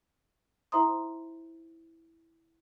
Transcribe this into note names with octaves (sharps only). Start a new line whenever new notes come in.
E4 C5 E5 A#5 C6 D#6